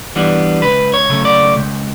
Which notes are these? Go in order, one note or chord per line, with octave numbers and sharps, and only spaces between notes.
E3 G3 B3 D4
C#2 B4
C#5
C#3 F#3 A3
D5
C#2